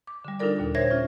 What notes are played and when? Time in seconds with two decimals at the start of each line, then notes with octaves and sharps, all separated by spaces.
0.07 D6
0.25 D3 G3
0.40 D4 D#4 F4 A4 A#4 D5
0.59 D#2 A#2
0.75 C5 C#5 E5 G#6 A#6
0.91 C#4 F4